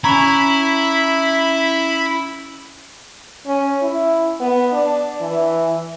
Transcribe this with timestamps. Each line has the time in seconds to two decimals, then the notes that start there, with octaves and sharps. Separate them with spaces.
0.04 C#4 E4 A#5 B5 C#6 G#6 F7
3.47 C#4
3.83 E4
4.40 B3
4.72 D4
5.21 E3